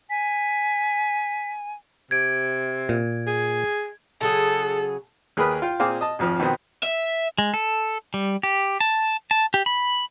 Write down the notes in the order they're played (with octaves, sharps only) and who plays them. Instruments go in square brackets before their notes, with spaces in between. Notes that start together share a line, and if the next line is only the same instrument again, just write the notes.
[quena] G#5 [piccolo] B6
[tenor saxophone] C3 [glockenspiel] G#6 D7
[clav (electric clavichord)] A#2
[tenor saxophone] G#4
[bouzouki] C#3 F#3 G#4 [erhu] A4
[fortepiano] D#2 G#4 A#4 B4 B5 D#6
F4 G5
A#2 C4 G#4 F5 G#5 D6
D#5 A5
G#1 F2 F3
B2 D#3 B3 C4
[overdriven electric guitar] E5
[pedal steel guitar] G#3
A4
G3
G4
A5
A5
G4
B5